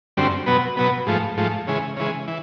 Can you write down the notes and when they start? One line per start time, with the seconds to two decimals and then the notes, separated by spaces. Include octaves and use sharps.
0.17 F#2 D3 G3 C4
0.46 B2 F#3 B3
0.77 B2 F#3 B3
1.07 G#2 F3 A3
1.37 G#2 F3 A3
1.67 C#3 E3 G#3
1.97 C#3 E3 G#3
2.28 E3